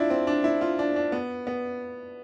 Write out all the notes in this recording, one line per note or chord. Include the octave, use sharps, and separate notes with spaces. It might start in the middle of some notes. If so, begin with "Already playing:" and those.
Already playing: D4 E4 F4
C4
D4
E4
F4
D4
D4
B3
B3